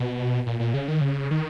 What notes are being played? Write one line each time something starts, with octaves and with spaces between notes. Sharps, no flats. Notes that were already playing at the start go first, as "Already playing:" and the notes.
Already playing: B2
A#2
A#2
C#3
D#3
C#3
D#3